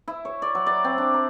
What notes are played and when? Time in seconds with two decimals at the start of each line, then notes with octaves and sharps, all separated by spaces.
0.08 E4
0.25 C#5
0.42 D5
0.55 F#3
0.66 D5
0.84 C4
0.98 D4
1.14 A#5